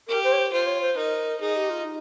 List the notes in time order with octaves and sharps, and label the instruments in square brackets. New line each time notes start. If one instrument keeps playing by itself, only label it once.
[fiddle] G4 [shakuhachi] A#4
[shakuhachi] C5
C#5
C5
[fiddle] F4 [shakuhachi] C5
[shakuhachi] C#5
C5
[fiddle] D#4 [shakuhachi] A#4
[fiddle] D#4 [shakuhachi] G#4
[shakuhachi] G4
F4
D#4